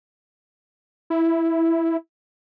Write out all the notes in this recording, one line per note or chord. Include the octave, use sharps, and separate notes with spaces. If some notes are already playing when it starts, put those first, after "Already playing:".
E4